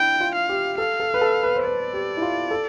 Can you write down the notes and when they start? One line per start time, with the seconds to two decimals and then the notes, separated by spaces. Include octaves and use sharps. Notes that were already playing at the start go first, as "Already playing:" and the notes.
Already playing: D4 E4 G5
0.21 F4
0.35 F5
0.49 G4
0.78 A4 F5
1.00 A4
1.14 B4
1.21 A4
1.43 B4
1.56 C5
1.64 B4 D5
1.94 G4
2.17 E4
2.22 F4
2.51 A4